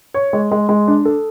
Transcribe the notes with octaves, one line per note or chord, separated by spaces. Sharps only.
C#5
G#3
G#3
G#3
D4
A4